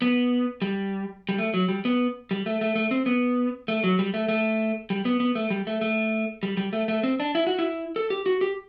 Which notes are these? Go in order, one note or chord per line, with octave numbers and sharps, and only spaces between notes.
B3
G3
G3
A3
F#3
G3
B3
G3
A3
A3
A3
C4
B3
A3
F#3
G3
A3
A3
G3
B3
B3
A3
G3
A3
A3
G3
G3
A3
A3
C4
D4
E4
F#4
E4
A4
G4
F#4
G4